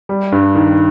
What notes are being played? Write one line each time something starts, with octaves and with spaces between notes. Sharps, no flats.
G3
G2
D#3